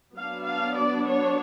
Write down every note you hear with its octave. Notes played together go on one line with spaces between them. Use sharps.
F#3 B3 D4 F5
F5
D5
C#5